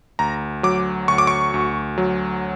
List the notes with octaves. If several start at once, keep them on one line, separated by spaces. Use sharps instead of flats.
D2 A#5
F#3 D6
D2 C#6
D6
C#6
D2
F#3